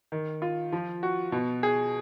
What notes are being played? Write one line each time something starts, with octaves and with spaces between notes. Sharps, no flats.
D#3
F4
F3
F#4
B2
G#4